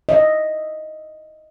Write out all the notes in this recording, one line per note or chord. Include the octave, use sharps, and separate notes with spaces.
D#5 E5